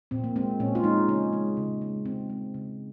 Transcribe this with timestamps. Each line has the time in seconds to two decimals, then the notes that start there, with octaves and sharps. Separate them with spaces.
0.11 A#2 C4
0.24 A#3
0.36 G#3 C4
0.60 A#2 C#4
0.75 F4
0.84 G#3 D#4
1.08 C#3 C#4
1.33 G#3
1.57 C#3
1.81 G#3
2.05 C#3 C4
2.30 G#3
2.54 C#3